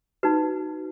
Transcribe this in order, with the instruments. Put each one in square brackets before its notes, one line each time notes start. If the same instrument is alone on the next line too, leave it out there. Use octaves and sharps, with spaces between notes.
[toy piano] D#4 F#4 B4